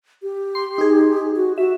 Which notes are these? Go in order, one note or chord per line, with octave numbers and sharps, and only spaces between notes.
G4
C6
D#4 G#4
F#4
F#4 E5